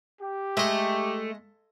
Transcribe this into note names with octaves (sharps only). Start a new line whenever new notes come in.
G4
G#3 A3 D#5